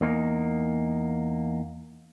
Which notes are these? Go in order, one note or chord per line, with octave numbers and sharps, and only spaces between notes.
E2 A#3 D#4